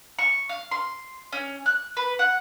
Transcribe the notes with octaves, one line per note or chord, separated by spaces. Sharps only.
C#6
F5
C6
C#4
F#6
B4
F#5